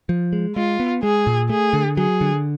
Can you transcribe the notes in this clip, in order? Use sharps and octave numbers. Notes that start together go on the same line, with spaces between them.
F3
G#3
G#3 F4
B3
G#3 G#4
A#2
A3 G#4
D3
F#3 G#4
D3